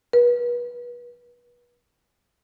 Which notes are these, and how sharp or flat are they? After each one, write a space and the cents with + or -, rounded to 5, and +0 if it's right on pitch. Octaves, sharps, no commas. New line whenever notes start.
B4 -35